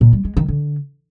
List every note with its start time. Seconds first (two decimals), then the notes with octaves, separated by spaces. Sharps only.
0.01 A#2
0.13 G3
0.25 G#3
0.37 D#3
0.48 D3